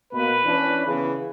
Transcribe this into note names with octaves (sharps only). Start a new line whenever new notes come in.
B2 A#3 B4
E3 C#4 D4
C#3 E3 B3